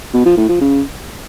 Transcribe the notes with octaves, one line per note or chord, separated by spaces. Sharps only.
B2
F3
A2
F3
C#3